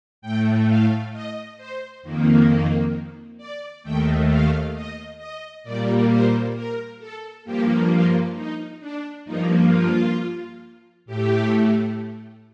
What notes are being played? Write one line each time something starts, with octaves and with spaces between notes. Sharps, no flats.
A2 A3 G5
F5
D#5
C5
F2 D#3 A#3
D5
D#2 D#3 A3 G5
F5
D#5
D#5
A#2 G3 A#3 D5
C5
A#4
A4
G2 F3 A#3 G4
F4
D#4
D4
G2 F3 A#3 D#4
F4
A2 A3 G4